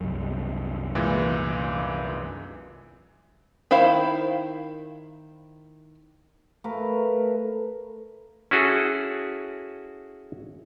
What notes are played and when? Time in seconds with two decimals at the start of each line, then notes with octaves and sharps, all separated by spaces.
0.01 C2 F#2
0.95 A#2 E3 G#3
3.71 D#3 E4 C5 F5
6.64 A3 A#4 B4 F5
8.51 C#4 E4 F#4 G#4 A4